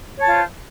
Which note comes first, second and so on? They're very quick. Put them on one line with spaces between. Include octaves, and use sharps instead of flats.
C#5 A5 F4 C5